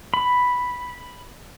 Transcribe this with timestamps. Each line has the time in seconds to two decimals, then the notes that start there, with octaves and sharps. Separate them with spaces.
0.14 B5